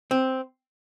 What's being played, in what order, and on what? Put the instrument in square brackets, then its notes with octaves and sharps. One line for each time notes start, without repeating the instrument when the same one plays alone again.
[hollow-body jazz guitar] C4